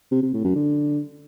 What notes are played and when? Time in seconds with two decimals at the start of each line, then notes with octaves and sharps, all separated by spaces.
0.12 C3
0.22 C3
0.33 A2
0.44 F#2
0.55 D3